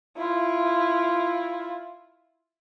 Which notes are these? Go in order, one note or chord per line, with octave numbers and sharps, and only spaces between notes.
E4 F4